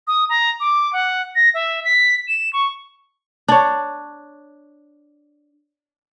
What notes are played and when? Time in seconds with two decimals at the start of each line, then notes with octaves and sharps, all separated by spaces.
0.07 D#6
0.29 A#5
0.60 D6
0.93 F#5
1.36 A#6
1.54 E5
1.85 B6
2.28 E7
2.53 C#6
3.48 D4 C#5